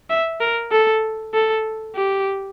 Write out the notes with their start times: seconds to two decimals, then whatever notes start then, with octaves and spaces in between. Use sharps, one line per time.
0.10 E5
0.41 A#4
0.72 A4
1.34 A4
1.95 G4